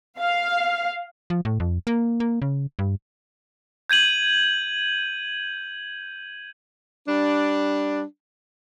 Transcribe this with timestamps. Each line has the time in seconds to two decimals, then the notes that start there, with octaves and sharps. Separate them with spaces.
0.20 F5
1.30 F3
1.45 A2
1.60 F2
1.87 A#3
2.20 A#3
2.42 C#3
2.79 G2
3.90 G6 G#6 D#7 F#7
7.07 G3 D4